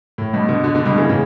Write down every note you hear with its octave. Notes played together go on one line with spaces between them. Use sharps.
A2
G2 B2
B2 D3
B2 D3
B2 D3
G2 B2
C#3 E3
A2 C#3